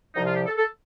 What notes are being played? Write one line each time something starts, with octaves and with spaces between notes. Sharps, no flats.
C2 C3 F3 D#4
F4
G4
A4
A4